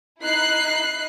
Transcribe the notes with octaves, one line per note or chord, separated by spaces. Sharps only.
D#4 E4 F#6 C7